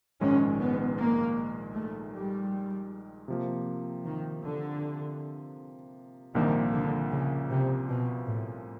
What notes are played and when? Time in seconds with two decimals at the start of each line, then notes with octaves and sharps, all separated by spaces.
0.21 A#1 G#2 D#3 G#3 C#4
0.60 B3
0.99 A#3
1.74 A3
2.13 G3
3.28 C3 F3 A#3
4.05 D#3
4.44 D3
6.35 C2 A#2 D#3 F3 A#3 D4
6.73 D3
7.11 C#3
7.50 C3
7.88 B2
8.26 A2